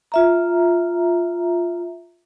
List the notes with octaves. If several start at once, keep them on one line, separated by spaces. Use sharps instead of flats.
F4 E5 A#5